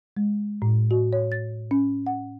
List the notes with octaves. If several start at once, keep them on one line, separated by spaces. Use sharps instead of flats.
G#3
A2
F#4
C#5
A6
C#4
F#5